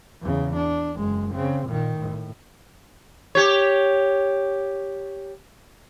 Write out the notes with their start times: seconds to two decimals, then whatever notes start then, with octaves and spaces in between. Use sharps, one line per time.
0.21 E2 C#3
0.56 D4
0.95 F#1 G#3
1.34 C#3 C4
1.66 A#2 D#3
1.97 A2
3.35 G4 C#5